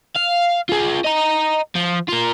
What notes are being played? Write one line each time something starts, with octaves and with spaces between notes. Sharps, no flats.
F5
F4 G#4
D#5 A#5
F3
F4 A#4